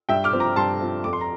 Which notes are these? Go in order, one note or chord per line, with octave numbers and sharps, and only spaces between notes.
G2 E5 G5
D6 F6
F3 C4
A#5 D6
G2 A5 C6
F3 C4
F2 D6
C6
A#5